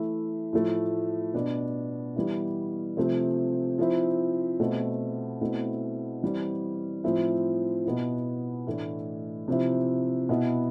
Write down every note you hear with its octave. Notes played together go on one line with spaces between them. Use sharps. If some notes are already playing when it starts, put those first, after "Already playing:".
Already playing: E3 A3 E4
A2 F3 A3
B2 B3 D4
E3 G3 B3 E4
C3 F3 A3 C4
F3 C4 E4
B2 A3 C4
B2 A3 C4 E4
E3 G3 C4
A2 F3 C4 E4
B2 B3 E4
A2 E3 A3 D4
C3 F3 C4 E4
B2 B3 E4